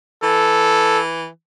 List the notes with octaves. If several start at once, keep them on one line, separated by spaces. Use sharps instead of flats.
E3 A4